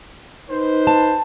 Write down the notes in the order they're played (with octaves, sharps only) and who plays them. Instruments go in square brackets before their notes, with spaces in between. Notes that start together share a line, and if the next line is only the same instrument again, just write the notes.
[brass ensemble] D#4 B4 C5
[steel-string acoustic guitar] A5